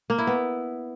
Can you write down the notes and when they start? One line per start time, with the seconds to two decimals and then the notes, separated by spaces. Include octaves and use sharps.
0.10 A#3
0.18 E4
0.27 B3